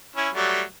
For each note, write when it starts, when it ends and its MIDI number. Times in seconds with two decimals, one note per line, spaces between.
0.16 0.29 61
0.16 0.29 64
0.35 0.62 54
0.35 0.62 55
0.35 0.62 57